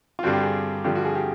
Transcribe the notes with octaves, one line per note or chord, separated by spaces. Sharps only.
F4
G2 D3 G3 C4 F#4
G4
G#4
G2 D3 F3 G4
F#4
G#4
G4